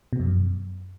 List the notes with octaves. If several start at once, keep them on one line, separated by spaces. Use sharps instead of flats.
B2
F2
F#2